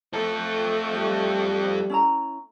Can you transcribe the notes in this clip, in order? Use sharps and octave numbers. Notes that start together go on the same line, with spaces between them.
F2 A3 A4
G3 E5
C#4 E4 A#5